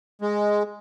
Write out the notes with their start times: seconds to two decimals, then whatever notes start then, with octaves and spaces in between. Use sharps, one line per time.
0.22 G#3